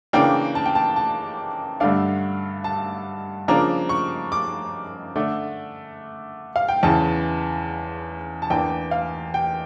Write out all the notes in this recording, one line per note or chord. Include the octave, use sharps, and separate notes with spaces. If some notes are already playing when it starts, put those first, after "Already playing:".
C#3 E3 A#3 D4 G5
A5
G5
A5
A5
G2 D3 A3 D4 F5
A5
C#3 F3 A#3 D4 A#5
C#6
D6
D3 A3 D4
F5
G5
E2 C#3 E3 A5
A5
E2 E3 A#3 D4 G5
F5
G5